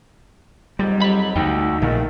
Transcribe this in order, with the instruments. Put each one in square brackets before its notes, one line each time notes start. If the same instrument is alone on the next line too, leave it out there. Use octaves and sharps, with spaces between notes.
[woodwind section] F2 G#2 F#3 [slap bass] G3
[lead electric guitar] G4 B5
[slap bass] D2 [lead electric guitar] D3 D#4 [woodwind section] G5
[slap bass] A#1 A#2 [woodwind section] D#3 A3